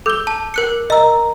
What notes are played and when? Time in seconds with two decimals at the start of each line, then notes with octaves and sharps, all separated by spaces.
0.06 A4 D6 E6 G6 G7
0.27 A5
0.54 A#4 F#6 C#7
0.90 A#4 D#5 A#5 E6